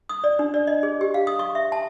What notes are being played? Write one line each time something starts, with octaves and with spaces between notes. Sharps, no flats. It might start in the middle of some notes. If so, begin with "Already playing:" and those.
D#6
D5
D4
D5
D#5
G#4
G4
F5
D#6
C#6
E5
A5